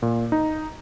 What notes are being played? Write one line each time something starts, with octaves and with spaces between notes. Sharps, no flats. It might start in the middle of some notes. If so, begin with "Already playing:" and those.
A#2
D#4